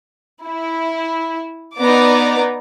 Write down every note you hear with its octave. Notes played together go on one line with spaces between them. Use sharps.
E4
B3 D#4 D5 A#5 D6